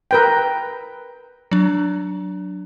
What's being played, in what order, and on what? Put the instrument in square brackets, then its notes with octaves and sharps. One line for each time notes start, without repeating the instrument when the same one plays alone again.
[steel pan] A#4 B4 G5
[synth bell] F#3 D4